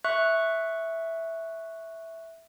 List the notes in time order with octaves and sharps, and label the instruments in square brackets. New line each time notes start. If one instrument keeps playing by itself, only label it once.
[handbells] E5 C#6 F#6